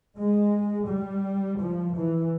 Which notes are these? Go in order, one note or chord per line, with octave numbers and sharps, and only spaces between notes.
G#3
G3
F3
E3